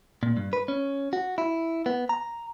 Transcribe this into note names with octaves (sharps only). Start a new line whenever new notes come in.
A#2
G2
B4
C#4
F#4
E4
B3
A#5